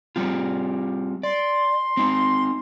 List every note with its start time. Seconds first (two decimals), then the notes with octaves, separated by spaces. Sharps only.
0.16 G3 C4 F4
1.23 D5 C6
1.97 C4 D#4